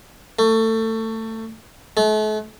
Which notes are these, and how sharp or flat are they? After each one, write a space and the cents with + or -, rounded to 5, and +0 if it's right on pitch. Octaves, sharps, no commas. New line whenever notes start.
A3 +25
A3 -40